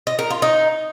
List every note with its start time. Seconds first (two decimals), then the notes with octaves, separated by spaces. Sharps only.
0.07 D#5
0.19 A#4
0.30 F4
0.42 D#4